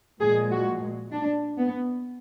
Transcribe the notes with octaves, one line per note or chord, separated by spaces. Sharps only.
A#2 F3 G#3 G#4
F#4
D4
B3